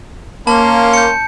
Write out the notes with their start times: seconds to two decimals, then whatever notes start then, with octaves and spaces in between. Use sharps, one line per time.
0.47 A#3 C#4 A5 C6
0.93 G6 C#7